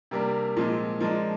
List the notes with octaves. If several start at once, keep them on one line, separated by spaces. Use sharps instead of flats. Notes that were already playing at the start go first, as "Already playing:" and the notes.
C3 G3 A#3 D4 A#4
A#2 F3 G#3 C4
F3 G#3 D4 A#4